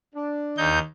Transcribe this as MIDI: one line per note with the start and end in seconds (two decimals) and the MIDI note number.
0.14 0.68 62
0.58 0.79 39
0.58 0.79 63
0.58 0.79 91